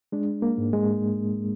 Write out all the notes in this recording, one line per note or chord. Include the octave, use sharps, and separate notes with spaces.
G#3 D4
A#3
G#2
G#3